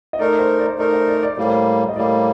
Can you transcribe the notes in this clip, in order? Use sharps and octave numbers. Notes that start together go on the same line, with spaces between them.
D#5
A3 D#4 A#4 D5
C5
D5
A3 D#4 A#4 D5
C5
D5
D5
A2 G3 A#3 C5
D#5
A2 G3 A#3 D5